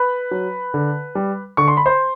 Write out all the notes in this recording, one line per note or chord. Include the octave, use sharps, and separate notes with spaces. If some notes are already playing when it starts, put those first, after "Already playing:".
Already playing: B4 B5
F#3
D3
G3
D3 C#6
C6
B5
C5 C6